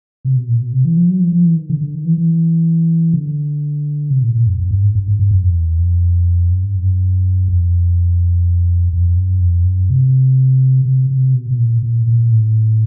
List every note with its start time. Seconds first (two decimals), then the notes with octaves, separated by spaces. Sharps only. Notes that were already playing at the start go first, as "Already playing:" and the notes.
0.25 C3
0.36 B2
0.49 A#2
0.60 B2
0.73 C3
0.85 E3
0.97 F3
1.09 F#3
1.21 F3
1.32 F3
1.45 E3
1.57 D#3
1.70 D3
1.81 D3
1.95 D#3
2.05 E3
2.17 E3
3.14 D3
4.10 C3
4.22 A#2
4.35 A#2
4.47 F#2
4.59 F#2
4.71 G2
4.82 G#2
4.95 G2
5.08 G#2
5.19 G2
5.31 F#2
5.43 F2
5.56 E2
5.79 F2
6.51 F#2
6.64 G2
6.75 F#2
7.48 F2
8.93 F2
9.16 F#2
9.41 F2
9.65 F#2
9.90 C3
10.85 C3
11.10 C3
11.34 B2
11.50 B2
11.58 A#2
11.82 A#2
12.07 A#2
12.31 A2